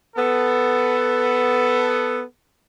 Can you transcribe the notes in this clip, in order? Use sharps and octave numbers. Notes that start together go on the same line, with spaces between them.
B3 A4